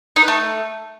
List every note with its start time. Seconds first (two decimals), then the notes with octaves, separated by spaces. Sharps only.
0.16 D#4
0.22 B4
0.28 A3